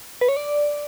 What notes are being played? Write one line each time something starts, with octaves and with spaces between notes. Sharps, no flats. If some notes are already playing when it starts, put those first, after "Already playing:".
B4
C#5
D5